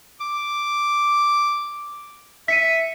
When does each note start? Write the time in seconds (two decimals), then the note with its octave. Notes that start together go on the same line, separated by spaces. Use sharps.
0.21 D6
2.48 E5 B6 C#7 D#7